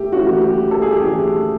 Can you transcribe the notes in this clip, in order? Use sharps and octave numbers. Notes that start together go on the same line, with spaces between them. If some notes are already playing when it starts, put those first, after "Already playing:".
Already playing: A3 G4
E3 A3 C#4 F#4
G4
A4
G#4
G4
E3 A3 C#4 G#4